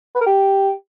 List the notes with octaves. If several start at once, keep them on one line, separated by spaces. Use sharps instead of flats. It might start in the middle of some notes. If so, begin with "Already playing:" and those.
B4
A#4
G4